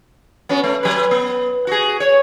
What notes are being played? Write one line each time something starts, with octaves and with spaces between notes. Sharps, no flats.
B3 C#4 F#4
A3
F#3 B4
B3
F#4 G#4
C#5